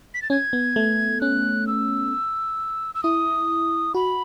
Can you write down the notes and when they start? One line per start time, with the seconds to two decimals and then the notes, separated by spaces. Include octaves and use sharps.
0.14 B6
0.22 A6
0.30 C#4 G#6
0.53 B3
0.76 A3
1.21 C#4 F#6
1.67 E6
2.95 E6
3.03 E4 D#6
3.94 F#4 B5